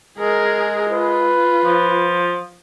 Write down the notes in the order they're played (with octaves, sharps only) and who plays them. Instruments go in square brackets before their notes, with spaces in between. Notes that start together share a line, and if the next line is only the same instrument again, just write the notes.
[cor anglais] G#3 [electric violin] G#4 A#4
[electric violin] F4 [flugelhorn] B4
[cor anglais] F3